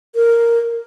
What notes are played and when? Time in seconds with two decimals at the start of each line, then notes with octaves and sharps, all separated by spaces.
0.15 A#4